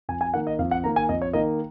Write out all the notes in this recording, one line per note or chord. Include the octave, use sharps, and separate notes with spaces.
F2 G#5
G#5
D#3 A#3 F#5
D#5
F2 F5
F#5
D#3 A#3 A#5
G#5
F2 D#5
C#5
D#3 A#3 D#5